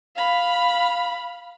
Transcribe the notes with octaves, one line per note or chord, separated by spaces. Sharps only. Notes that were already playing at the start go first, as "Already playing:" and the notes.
F5 B5